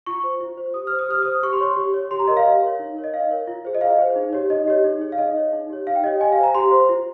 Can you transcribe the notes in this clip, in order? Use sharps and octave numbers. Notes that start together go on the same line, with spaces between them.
F4 C#6
C5
F4
C5
G4 D#6
C5 F6
D#6
G4 F6
D#6
C5
G4 C#6
C6
C#5 C#6
G4
C#5
G4 C6
A#5
A#4 C#5 D#5
F5
G4
A#4 C#5
D#4
A#4 C#5
D#5
D#4 F5
A#4 C#5
F4
G#4 C5
D#5
F4 F5
G#4 C5
D#4
G4 C#5
D#4 D#5
G4 C#5
D#4
G#4 C#5
F5
D#4 D#5
G#4 C#5
D#4
G4 C#5
D#4 F5
G5
G4 C#5 D#5
G4 G#5
F5
C5
A#5
G4 C6
C5
F4